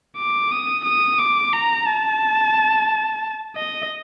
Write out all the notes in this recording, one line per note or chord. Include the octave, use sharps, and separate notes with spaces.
D6
D#6
D#6
D6
A#5
A5
D#5